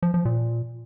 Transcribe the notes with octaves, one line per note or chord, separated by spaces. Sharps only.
F3
F3
A#2